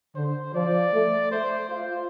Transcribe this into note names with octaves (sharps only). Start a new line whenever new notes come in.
D3 C5
F3 D5
A3
A3 C5
F4 C5